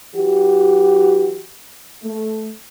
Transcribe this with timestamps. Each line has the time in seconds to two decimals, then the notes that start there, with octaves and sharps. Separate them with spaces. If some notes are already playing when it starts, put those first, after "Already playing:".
0.16 E3 F#3 F#4 G4
2.04 A3